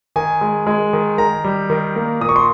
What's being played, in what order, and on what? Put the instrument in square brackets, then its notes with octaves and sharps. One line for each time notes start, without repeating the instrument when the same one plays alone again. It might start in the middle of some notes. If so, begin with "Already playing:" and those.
[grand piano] D#3 G#5
G#3
G#3
D#3
D#3 A#5
G3
D#3
A#3
A#2 D#6
C#6
C6